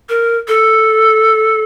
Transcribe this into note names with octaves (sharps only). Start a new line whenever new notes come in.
A#4
A4